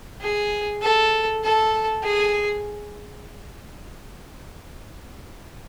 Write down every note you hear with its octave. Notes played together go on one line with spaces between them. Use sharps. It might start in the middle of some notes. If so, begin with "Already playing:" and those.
G#4
A4
A4
G#4